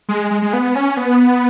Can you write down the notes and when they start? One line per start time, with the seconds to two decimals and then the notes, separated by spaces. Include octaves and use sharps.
0.09 G#3
0.31 G#3
0.42 G#3
0.53 B3
0.75 C#4
0.97 B3